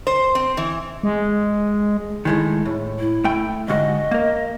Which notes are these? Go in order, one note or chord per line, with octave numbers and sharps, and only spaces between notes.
C5
C4
E3
G#3
D#3 G#3 A3 E4
A2
E4
A3 G5
D2 G#2 F#4 D#5
A#3 A#4